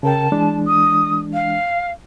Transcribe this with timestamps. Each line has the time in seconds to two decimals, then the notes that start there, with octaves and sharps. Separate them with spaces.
0.03 C#3 A#4 G5 A5
0.32 E3 G#3 D4
0.67 D#6
1.33 F5